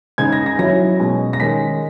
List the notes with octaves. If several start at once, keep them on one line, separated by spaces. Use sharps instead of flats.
C#3 G#3 D#4 G#6
A#6
A#6
F#3 C#4 E4 A#6
B2 G#3 C#4
A#6
D#3 G#3 C#4 B6